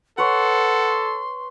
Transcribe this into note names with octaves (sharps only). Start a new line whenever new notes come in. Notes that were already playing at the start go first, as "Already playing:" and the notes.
A4 B4 C#5 F#5 C6